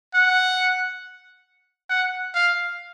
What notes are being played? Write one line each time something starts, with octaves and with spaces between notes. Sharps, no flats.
F#5
F#5
F5